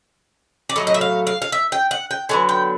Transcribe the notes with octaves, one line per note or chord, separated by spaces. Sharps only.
D5
A2 F#3 A3 D#5
D#5
E5
F5
F5
F5
E5
G5
F#5
G5
D3 F#3 B3 G#5
G5